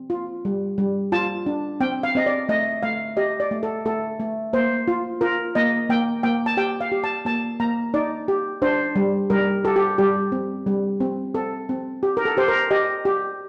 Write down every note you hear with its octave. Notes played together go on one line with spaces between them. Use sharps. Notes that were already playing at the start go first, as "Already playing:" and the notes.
Already playing: C4
F4
G3
G3
F4 A5
D4
C4 G5
F5
C4 D#5
D5
A3 D#5
A3 F5
G4 D#5
D5
A3
A4
A3 A4
A3
A#3 C5
F4
F4 A#4
A#3 D#5
A#3 G5
A#3 G5
A5
G4 G5
F5
G4
A5
A#3 A5
A#3 A#5
D#4 D5
G4
D4 C5
G3
G3 A#4
G4 A4
G4
G3 G4
C4
G3
C4
C4 A4
C4
G4
A#4
A4
G4 C5
A#4
G4 D#5
G4